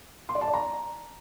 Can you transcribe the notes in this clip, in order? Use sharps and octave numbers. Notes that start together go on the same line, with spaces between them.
C6
D5
A5
D5
A#5